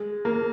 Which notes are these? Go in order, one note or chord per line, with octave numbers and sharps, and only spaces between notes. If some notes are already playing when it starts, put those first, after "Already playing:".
Already playing: G#3
A#3